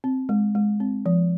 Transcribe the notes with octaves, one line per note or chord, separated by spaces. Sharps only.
C4
G#3
G#3
C4
F3